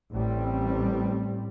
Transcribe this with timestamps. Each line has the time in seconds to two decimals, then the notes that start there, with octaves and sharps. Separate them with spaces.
0.13 A1 A2 G3 C4